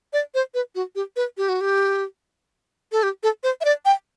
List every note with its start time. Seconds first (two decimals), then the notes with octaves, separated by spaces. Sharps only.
0.13 D5
0.34 C5
0.54 B4
0.75 F#4
0.95 G4
1.16 B4
1.38 G4
1.49 F#4
1.61 G4
2.92 A4
3.03 G4
3.23 A4
3.43 C5
3.61 E5
3.65 D5
3.85 G5